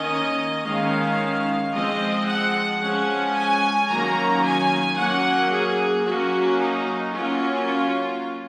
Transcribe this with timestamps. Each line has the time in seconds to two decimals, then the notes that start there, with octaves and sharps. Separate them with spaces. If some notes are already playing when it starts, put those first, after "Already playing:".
Already playing: D#3 A#3 C#4 D#5
0.65 D#3 G#3 C#4 F5
1.73 F3 G#3 C4 D#5
2.27 F#5
2.81 F3 G#3 C#4 F#5
3.35 G#5
3.89 D#3 F#3 A#3 C#4 A#5
4.43 G#5
4.97 F#3 A#3 C#4 F#5
5.51 G#4
6.05 F#3 A#3 C#4 F#4
6.59 D#4
7.12 F#3 A#3 C#4 F4
7.67 F4